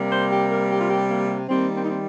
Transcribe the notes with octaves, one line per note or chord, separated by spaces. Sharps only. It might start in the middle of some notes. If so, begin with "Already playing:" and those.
Already playing: C3 G3 A#3
C5
G4
A#4
G4
F4
G4
A#3
D#3 G3 A#3 C4
C4
D#4
C4